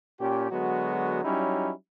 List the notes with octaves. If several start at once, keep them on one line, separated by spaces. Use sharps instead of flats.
A#2 C#4 G4
D3 F#3 G#3 B3 F#4
F#3 G3 C#4 D#4 E4